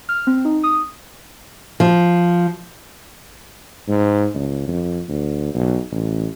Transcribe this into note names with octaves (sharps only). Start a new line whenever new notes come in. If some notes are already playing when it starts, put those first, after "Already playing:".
F6
C4
D#4
D#6
F3
G#2
C#2
F2
D2
B1
A1